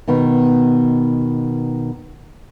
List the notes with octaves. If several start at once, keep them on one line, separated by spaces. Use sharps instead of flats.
B2 D#3 B3